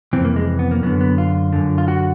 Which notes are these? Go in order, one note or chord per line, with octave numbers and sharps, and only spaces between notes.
F2 C3 E3 C4
A#3
G#3
B3
A#3
F#2 D3 B3
B3
F4
F#2 D3
F4
F#4